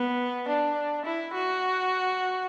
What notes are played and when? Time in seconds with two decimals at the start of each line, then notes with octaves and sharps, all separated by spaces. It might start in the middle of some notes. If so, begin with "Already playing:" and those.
Already playing: B3
0.48 D4
1.05 E4
1.34 F#4